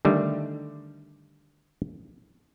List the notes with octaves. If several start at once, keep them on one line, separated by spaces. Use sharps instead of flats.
D3 D#3 G3 A3